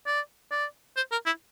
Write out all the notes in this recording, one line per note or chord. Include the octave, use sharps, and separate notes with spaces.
D5
D5
C5
A#4
E4